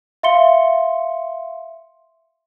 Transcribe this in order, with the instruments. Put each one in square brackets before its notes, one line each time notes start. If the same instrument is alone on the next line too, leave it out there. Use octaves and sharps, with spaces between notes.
[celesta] E5 F5 C6 C#7 G7